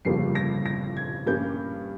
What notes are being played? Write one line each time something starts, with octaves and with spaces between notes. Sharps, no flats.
G1 F2 C#3 G3 A#3 C7
A#6
A#6
G#6
G2 G3 A#3 C#4 G6